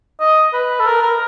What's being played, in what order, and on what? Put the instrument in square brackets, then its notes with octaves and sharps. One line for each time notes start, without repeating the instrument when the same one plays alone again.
[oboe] D#5
B4
A4
A#4
A#4